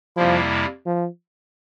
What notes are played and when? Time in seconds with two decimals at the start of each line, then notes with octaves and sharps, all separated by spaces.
0.17 F2 C3 F3 G3 A#3 E4
0.86 F3